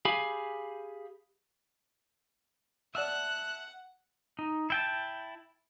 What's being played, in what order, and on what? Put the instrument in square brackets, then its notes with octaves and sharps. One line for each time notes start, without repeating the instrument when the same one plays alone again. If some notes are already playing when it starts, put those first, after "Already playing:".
[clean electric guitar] G4 G#4 F5 G#5 B5
[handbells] D5 F6 [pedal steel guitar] E5 A5 [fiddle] F#5 [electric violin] F#6
[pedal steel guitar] D#4
E4 G5 A5